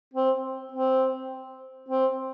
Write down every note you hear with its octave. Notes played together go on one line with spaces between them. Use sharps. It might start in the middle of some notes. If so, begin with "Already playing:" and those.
C4
C4
C4